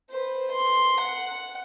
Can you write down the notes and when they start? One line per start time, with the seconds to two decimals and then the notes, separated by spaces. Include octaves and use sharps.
0.10 B4 C5
0.51 C6
1.00 F#5